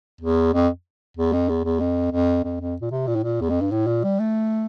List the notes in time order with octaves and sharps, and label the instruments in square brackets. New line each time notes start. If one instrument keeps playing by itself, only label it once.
[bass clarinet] E2
F2
E2
F2
E2
E2
F2
F2
F2
F2
A#2
C3
A#2
A2
A#2
E2
F2
G2
A2
A#2
G3
A3